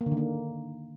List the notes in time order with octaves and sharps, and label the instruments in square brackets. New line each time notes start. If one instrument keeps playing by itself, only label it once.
[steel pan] A#3
D3
D#3
A#3